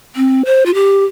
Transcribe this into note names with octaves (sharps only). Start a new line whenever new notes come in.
C4
C5
F4
G4